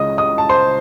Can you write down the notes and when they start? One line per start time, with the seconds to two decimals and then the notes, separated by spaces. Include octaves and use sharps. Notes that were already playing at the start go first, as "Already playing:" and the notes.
Already playing: C#2 C#3 G#3 D#5 D#6
0.18 D#5 D#6
0.38 A5
0.49 C5 C6